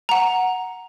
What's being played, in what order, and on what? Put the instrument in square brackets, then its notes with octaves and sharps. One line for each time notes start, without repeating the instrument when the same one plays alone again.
[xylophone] F#5 A#5